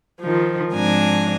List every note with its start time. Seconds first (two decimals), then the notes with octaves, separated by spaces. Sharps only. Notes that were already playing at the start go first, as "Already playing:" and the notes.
0.21 D#3 F3
0.73 G#2 F3 C4 D4 G#5 A#5